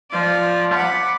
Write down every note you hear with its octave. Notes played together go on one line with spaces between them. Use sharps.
F3 D5
F#5 B5 D6